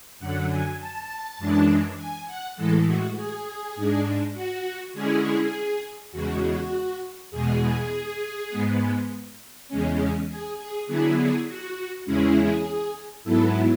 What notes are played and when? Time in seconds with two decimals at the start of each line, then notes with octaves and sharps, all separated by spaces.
0.20 F#2 D3 F#3 F#5
0.49 G#5
0.79 A5
1.38 F#2 E3 G#3 D4
1.97 G#5
2.26 F#5
2.56 A2 E3 G#3 A4
2.86 F#4
3.15 G#4
3.76 G#2 G#3 D4
4.34 F#4
4.94 D3 G#3 C#4 E4 G#4
6.12 E2 C#3 G#3 F#4
7.31 E2 B2 G#3 G#4
8.50 G#2 G#3 B3
9.68 E2 C#3 G#3 C#4
10.28 G#4
10.57 G#4
10.87 D3 F#3 B3 E4 G#4
11.16 G#4
11.47 F#4
12.05 E2 C#3 G#3 C#4 E4 G#4
13.24 G#2 F#3 B3 E4 A4